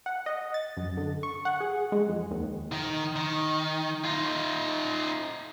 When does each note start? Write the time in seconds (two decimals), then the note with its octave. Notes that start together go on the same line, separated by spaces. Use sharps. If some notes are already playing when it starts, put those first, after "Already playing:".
0.06 F#5
0.26 D#5
0.54 A6
0.77 F#2
0.97 D3
1.23 C#6
1.45 F#5
1.61 G#4
1.92 G#3
2.09 F2
2.31 D#2
2.72 D#3
3.16 D#3
4.04 D#4 F4